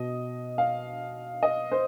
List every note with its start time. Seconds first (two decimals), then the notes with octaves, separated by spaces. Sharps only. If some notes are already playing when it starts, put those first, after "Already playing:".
Already playing: B2 D#5
0.58 F5
1.43 D#5
1.72 C5